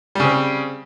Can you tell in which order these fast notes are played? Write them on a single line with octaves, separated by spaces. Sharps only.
G3 C#3 C4